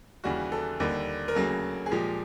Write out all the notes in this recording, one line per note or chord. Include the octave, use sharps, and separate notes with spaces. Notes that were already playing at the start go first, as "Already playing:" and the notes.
D#2 C#3 E3 G3 F#4
A4
D#2 D3 G3 A#3
A#4
D2 C#3 F#3 A#3 A4
G#4
A#2 F3 G#3 G4